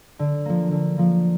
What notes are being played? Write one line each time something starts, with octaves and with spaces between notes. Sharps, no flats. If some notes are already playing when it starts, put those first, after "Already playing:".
D3
F3 A#3
D3
F3 A#3